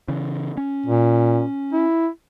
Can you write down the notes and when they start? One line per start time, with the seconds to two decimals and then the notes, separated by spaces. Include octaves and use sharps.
0.08 C#3 E3
0.57 C#4
0.86 A#2
1.73 E4